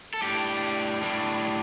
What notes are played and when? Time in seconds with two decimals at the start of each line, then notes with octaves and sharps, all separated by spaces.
0.14 A4
0.22 A2 G3 D4 G4
1.01 A2 G3 D4